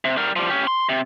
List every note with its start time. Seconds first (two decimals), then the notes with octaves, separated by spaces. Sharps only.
0.05 C3
0.17 G3 A#4
0.36 F3 G3
0.50 C#4 G4
0.67 C6
0.89 C3